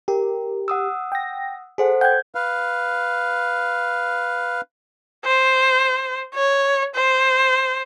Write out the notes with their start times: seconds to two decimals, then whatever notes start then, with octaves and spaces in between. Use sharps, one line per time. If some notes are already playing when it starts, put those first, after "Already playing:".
0.08 G4 A#4
0.68 F#5 D#6 E6
1.12 G5 A#6
1.78 G#4 A4 C5 F#5
2.01 F#5 G5 G6 G#6
2.35 B4 F5
5.25 C5
6.35 C#5
6.95 C5